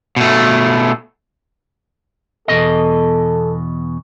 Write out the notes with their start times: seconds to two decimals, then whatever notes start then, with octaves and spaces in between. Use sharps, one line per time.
0.16 B2 A3
2.48 E2 B2 A4 D#5